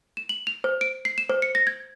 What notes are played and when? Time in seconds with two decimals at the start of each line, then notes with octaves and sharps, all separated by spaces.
0.17 E7
0.29 F#7
0.47 F7
0.64 C5
0.81 D7
1.05 C7
1.18 E7
1.29 C5
1.42 C#7
1.55 A#6
1.67 G#6